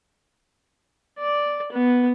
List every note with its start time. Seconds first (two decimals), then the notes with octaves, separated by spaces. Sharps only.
1.19 D5
1.72 B3